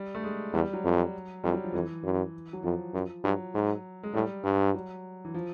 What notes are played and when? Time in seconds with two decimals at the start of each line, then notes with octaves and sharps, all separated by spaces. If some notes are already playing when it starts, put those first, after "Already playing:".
Already playing: G3
0.15 A3
0.24 G#3
0.53 E2 G3
0.73 F#3
0.84 F2
1.44 F2 G3
1.54 F#3
1.64 F3
1.73 F2 E3
2.04 F#2
2.53 F#3
2.64 F2 F3
2.94 F#2
3.24 G2 F#3
3.54 G#2
4.03 G#3
4.14 A2 G3
4.44 G2
4.74 F#3
5.25 E3
5.34 F3